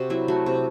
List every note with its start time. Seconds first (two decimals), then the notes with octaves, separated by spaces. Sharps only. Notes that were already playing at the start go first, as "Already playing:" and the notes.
Already playing: C3 F#4
0.10 F#3 E4
0.28 A3 F#4
0.46 C3